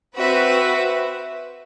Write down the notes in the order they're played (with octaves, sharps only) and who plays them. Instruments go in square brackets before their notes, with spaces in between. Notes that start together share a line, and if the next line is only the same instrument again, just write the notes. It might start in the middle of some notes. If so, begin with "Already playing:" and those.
[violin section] C4 F#4 B4 E5